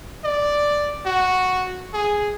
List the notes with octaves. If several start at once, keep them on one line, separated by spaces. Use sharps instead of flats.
D5
F#4
G#4